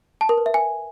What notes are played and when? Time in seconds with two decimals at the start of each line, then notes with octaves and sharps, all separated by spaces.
0.21 A5
0.29 A#4
0.38 B4
0.46 E5
0.54 G#5